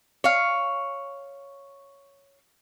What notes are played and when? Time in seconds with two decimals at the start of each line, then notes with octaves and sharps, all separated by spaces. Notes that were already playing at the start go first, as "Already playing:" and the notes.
0.24 C#5 F5